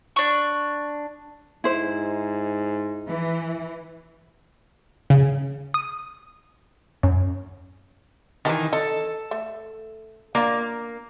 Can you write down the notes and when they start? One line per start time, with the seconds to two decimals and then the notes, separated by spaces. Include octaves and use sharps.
0.16 D4 C#6
1.64 G#2 E4 C5
3.10 E3
5.10 C#3
5.74 D#6
7.03 F#2
8.45 D#3 E3 D#4 G4 A5
8.73 A4 D#5
9.31 A3
10.35 A#3 D4 F4